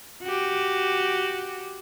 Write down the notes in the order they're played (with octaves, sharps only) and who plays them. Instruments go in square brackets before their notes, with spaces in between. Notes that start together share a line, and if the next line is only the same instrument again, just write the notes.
[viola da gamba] F#4 G4